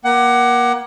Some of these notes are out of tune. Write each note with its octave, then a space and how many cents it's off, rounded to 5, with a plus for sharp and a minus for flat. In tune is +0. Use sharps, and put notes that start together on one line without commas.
A#3 +30 F#5 +25